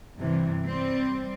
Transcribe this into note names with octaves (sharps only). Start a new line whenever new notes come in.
G2 C3 E3
G3 C4